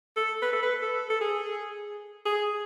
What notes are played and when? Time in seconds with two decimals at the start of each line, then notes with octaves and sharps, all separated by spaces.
0.16 A4
0.42 B4
0.53 A4
0.63 B4
0.82 A4
1.10 A4
1.21 G#4
2.25 G#4